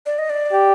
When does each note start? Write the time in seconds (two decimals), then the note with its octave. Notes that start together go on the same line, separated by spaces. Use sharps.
0.06 D5
0.19 D#5
0.30 D5
0.52 G4